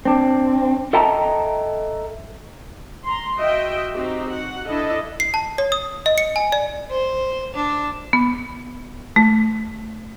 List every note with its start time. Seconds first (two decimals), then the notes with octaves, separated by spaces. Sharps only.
0.05 C4 D4
0.93 A4 D#5 E5 G5 A5 A#5
3.04 A#5 C6
3.38 F#4 D#5 E5 G5
3.92 C4 D#4 F#4 G4
4.29 F#4 F#5
4.69 D4 E4 A4 D#5
5.20 C7
5.34 A5
5.58 C#5
5.72 D#6
6.06 D#5
6.18 C#7
6.36 G#5
6.52 D5
6.90 C5
7.55 D4
8.13 B3
9.16 A3